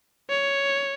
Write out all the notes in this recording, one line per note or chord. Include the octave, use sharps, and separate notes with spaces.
C#5